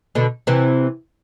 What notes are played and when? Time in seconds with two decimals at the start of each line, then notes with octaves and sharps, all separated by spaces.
0.15 B2 D3
0.47 C3 E3